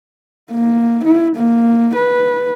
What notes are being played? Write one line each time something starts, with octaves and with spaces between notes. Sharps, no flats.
A#3
E4
A#3
B4